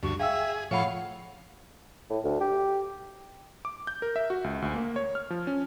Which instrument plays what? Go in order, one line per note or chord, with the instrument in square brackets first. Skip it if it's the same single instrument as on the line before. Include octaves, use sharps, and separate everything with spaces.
[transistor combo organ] D2 G2 [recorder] F#4
[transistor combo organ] G#4 [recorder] E5 [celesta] F5 G5 E6
[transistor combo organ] A2 F3 C#6 [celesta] C#5 F#5 B5 [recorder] F5
[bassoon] A2
D2
G4
[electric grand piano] D6
G6
A#4
E5
F#4
C#2
D2
A#3
C#5
F6
F3
C#4